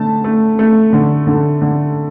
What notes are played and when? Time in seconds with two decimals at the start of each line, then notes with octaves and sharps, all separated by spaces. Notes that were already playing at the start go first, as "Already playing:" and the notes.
Already playing: D3 A3 A5
0.24 A3
0.59 A3
0.93 D3
1.27 D3
1.61 D3